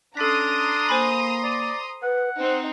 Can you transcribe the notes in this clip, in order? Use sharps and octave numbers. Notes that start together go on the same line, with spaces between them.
C#4 D4 A4 A#5 C6 D#6 B6
A#3 C5 G#5 B5
D5
B4 F#5
C4 D#4 C5